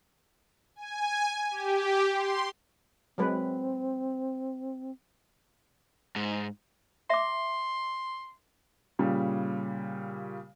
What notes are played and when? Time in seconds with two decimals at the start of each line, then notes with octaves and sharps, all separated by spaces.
0.76 G#5
1.50 G4
2.13 C6
3.18 F#3 G#3 C4 B4
6.16 G#2
7.10 E5 C6 D6
8.99 A#2 C#3 G3